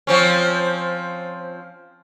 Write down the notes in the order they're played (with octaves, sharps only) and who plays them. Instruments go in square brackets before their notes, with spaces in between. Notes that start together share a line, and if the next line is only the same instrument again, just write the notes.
[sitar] F3 C4 C#4